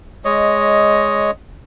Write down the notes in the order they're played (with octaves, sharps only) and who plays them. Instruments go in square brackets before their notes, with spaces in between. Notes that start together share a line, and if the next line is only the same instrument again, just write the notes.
[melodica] G#3 C#5 D#5